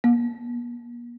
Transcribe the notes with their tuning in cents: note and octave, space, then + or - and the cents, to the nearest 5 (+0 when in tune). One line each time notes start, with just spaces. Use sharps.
A#3 +45